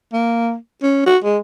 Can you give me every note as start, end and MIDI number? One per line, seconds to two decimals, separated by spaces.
0.13 0.55 58
0.82 1.04 61
1.06 1.17 66
1.24 1.38 56